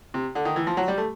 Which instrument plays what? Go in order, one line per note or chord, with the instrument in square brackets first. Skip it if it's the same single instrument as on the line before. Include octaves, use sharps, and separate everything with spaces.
[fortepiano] C3
D3
D#3
E3
F3
F#3
G3
A3